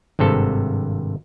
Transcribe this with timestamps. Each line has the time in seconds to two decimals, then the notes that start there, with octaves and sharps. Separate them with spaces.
0.19 G#1 G2 C3 A4 A5